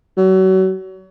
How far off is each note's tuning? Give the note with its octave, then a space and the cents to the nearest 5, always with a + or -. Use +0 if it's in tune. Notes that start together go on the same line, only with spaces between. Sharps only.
F#3 +30